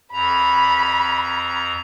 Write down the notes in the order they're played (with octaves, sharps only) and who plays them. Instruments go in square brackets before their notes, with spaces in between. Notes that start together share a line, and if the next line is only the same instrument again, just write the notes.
[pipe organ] F2 A#5 [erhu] B5